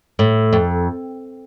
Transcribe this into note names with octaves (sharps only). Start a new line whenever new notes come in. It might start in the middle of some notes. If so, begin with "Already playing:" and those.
A2
F2